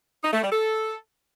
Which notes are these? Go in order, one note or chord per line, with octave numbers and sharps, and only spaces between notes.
D#4
A3
G3
A4